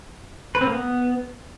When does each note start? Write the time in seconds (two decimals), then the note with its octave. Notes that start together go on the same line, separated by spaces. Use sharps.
0.55 B4
0.61 C4
0.67 A#3
0.73 B3